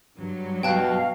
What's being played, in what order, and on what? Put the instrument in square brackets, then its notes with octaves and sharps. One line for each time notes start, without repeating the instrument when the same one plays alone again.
[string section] G2 F#3
[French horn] B2 [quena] F5 [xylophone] G5 A5 F#6